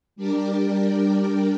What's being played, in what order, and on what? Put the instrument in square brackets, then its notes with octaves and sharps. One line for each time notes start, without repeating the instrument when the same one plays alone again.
[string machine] G3 D4 G4 A#4 D5